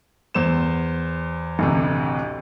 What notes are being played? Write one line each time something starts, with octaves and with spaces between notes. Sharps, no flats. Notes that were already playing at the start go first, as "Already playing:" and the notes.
E2 C5 E7
A1 D2 C3